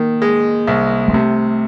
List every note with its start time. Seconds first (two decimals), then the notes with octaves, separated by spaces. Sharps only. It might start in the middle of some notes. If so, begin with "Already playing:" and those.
Already playing: D#3 A#3
0.22 G#3
0.67 C2
1.08 G#3
1.13 C3 A3